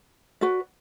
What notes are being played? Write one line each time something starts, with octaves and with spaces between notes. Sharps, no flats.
F#4 B4 D5